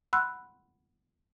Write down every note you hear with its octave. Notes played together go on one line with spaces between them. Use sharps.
F#5 B5 C6 E6 F#6